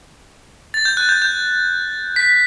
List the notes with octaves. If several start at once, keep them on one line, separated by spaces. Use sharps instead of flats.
A6
G6
F#6
G6
G6
B6